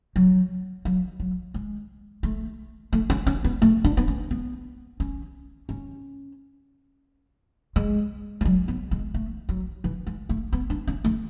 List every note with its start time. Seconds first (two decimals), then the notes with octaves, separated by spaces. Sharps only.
0.16 F#3
0.85 F#3
1.20 F#3
1.54 G#3
2.23 A3
2.93 A3
3.10 C#4
3.26 C#4
3.44 B3
3.62 A3
3.84 D4
3.97 B3
4.08 C#4
4.31 B3
5.00 C#4
5.69 C#4
7.76 G#3
8.41 G#3
8.45 F#3
8.68 B3
8.91 G#3
9.14 A3
9.49 F#3
9.84 E3
10.07 G#3
10.29 A3
10.53 B3
10.70 D4
10.87 C#4
11.04 A3